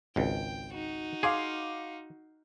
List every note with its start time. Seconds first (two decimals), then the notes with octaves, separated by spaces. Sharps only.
0.16 G#1 C#2 G5
0.73 D#4 F#4
1.23 G#4 F5 C6 D6